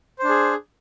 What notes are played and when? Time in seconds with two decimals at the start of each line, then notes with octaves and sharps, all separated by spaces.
0.19 C5
0.24 D4
0.29 G#4